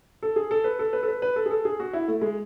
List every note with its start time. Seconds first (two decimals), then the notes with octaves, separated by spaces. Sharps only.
0.23 A4
0.36 G#4
0.51 A4
0.64 B4
0.79 A4
0.93 B4
1.03 A4
1.08 B4
1.22 B4
1.36 A4
1.46 G#4
1.51 A4
1.65 G#4
1.80 F#4
1.94 E4
2.08 A3
2.22 G#3